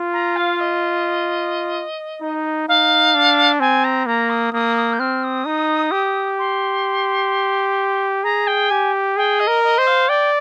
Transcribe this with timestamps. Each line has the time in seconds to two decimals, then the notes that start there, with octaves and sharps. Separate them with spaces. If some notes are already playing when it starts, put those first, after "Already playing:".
Already playing: F4
0.12 A#5
0.36 F5
0.60 D#5
2.21 D#4
2.68 D#4 F5
3.15 D4
3.60 C4 G#5
3.84 A#5
4.06 A#3 A#5
4.29 D#6
4.53 A#3 D#6
4.76 D#6
4.92 G6
4.99 C4 F6
5.23 D#6
5.45 D#4
5.91 G4
6.38 C6
8.23 G#4 A#5
8.47 G5
8.70 G4 G#5
9.17 G#4 G5
9.39 D#5
9.48 A#4
9.63 D#5
9.78 C5
9.86 F5
10.09 D5 G5